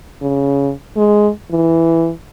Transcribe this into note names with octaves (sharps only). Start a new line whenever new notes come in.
C#3
G#3
E3